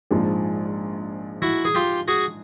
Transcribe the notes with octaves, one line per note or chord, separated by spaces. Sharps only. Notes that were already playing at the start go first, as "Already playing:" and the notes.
A#1 G#2 F3
E4 F#4
G#4
F4 G4
F#4 G#4